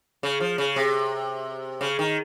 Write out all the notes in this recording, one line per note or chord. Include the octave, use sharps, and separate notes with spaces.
C#3
F3
C#3
C3
C#3
D#3